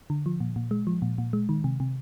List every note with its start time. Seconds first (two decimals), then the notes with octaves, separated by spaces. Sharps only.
0.10 D3
0.26 F3
0.40 A#2
0.56 A#2
0.71 G#3
0.87 F3
1.02 A#2
1.18 A#2
1.33 G#3
1.49 D#3
1.64 C3
1.80 C3